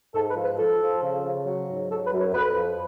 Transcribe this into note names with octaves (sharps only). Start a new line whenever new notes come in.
G#2 A4
B4
F3
B4
F3 A4
F3
C#3
C#3
F#3
G#2
F#3 A4
B4
F#2
C#5
F2 B4
F3